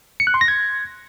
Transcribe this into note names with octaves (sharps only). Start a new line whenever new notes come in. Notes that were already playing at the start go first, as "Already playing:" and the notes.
C#7
F#6
C6
A#6
G#6